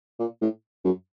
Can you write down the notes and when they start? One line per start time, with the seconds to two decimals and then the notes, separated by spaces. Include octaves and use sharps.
0.19 A#2
0.41 A2
0.84 F#2